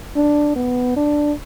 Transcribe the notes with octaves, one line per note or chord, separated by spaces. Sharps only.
D4
B3
D4